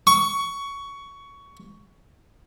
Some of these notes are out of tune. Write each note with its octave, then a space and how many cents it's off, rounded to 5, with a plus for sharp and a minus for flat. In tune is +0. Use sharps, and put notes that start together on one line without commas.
C#6 +15